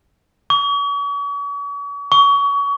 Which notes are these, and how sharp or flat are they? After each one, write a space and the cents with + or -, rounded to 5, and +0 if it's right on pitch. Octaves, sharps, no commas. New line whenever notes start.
C#6 +45
C#6 +30